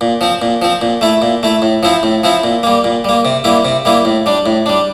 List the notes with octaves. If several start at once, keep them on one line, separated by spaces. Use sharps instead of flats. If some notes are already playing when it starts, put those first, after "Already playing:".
A#2
F3 C4
A#2
F3 C4
A#2
A3 E4
A#2
A3 E4
A2
F3 C4 E4
A2
F3 C4 E4
A#2
G3 A#3
A#2
G3 A#3
C3
G3 A#3 E4
C3
G3 A#3 E4
A2
G3 D4
A2
G3 D4